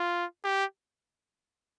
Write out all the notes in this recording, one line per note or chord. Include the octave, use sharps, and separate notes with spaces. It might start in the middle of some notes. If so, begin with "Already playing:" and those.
Already playing: F4
G4